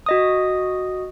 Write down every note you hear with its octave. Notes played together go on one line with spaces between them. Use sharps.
F#4 D#5 D#6